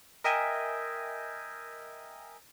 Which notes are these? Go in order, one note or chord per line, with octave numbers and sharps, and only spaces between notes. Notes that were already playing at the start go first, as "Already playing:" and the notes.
A#4 D#5 E5 G5 G#5